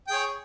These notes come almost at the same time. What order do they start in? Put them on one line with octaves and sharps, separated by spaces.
G5 G#4 C#5